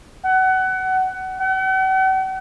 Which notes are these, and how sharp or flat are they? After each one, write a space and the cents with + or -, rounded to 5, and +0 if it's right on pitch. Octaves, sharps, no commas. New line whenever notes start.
F#5 +25
F#5 +45